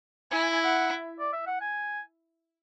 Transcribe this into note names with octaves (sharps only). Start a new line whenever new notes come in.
E4 G#5
G#5
G#5
F#5
D5
E5
F#5
G#5